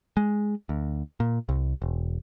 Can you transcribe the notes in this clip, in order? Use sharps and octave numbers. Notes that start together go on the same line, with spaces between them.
G#3
D2
A#2
C2
E1